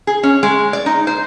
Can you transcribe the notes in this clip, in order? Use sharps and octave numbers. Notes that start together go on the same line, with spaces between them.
G#4
C#4
G#3
D5
D#4
C5